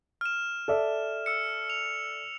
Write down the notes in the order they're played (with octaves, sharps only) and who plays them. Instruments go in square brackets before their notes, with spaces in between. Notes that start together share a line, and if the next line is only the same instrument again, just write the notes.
[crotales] F6 E7
[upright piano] A4 D5 E5
[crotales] E6 C#7
F7